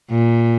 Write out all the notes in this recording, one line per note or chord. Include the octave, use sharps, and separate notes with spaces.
A#2